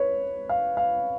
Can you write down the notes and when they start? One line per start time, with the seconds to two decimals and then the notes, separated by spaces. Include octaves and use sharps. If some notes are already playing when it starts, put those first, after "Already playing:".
Already playing: B4 C#5
0.49 F5
0.77 F5